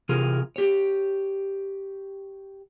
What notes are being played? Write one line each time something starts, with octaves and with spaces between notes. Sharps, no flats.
C3 E3 F4 G#4 A#4
G4 C#5